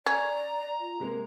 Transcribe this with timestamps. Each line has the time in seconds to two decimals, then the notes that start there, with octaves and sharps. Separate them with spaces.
0.06 C#4 D5 A#5
0.80 F4
1.00 C3 G#3 A#3 A#4